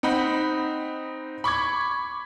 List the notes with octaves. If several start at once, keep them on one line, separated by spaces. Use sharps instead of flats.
C4 D#4 F#5 B5
B5 C#6 D6 G#6